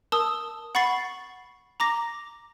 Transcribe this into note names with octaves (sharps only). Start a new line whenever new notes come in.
A#4 A5 D#6 E6
F#5 B5 C#6 A6 C7 F#7
A#5 D6 A#6